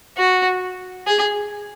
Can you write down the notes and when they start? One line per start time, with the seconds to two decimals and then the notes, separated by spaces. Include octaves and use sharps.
0.17 F#4
1.07 G#4